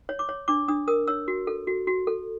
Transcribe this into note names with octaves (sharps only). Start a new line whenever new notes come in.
C#5
D6
C#5
D4 D6
D4 D#6
A#4 D#6
C#5 E6
F#4
A4
F#4
F#4
A4